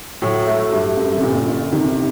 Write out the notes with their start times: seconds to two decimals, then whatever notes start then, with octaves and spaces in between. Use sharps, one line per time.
0.22 A2 F#3
0.47 A3
0.72 G2 A3
0.97 F#2
1.17 C3
1.22 G1 A#2
1.48 G1
1.73 C3 D#3